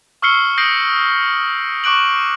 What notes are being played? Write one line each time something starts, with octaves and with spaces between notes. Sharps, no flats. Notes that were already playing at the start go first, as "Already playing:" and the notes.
C#6 E6 F6 C7 C#7 G7
D#6 G6 A#6 C7 D7 F#7
C#6 D6 F#6 D7 F#7